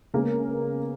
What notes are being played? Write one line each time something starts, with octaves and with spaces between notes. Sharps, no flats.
C#3 G#3 A#3 B3 A#4